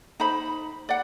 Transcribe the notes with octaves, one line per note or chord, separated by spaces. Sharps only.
D#4 C5 B5
D5 F#5